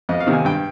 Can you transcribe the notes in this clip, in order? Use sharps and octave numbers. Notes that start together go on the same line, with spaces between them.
F2 D#5
F5
C3 D#3
G#5
G2 G5